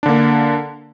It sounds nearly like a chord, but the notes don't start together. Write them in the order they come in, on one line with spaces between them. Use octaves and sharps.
D4 D3 A#3